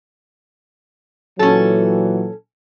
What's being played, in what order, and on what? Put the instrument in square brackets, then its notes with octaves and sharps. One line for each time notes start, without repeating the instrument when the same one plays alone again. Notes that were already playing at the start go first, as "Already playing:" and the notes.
[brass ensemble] A#2 E3 F#3 [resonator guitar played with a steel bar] C#4 A4